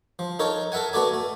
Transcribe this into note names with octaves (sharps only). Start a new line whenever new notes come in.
F3
D#4 A4 A#4 C#5
A4 A#4 E5 F#5 G#5
A3 B3 F#4 A4 D5 G#5
A3